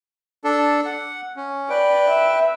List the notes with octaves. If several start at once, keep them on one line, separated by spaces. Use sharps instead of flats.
D4 A4
F#5
C#4
B4 D5 G5
E5